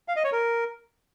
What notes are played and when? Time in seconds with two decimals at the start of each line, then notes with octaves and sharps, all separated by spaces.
0.08 F5
0.16 D#5
0.24 C#5
0.32 A#4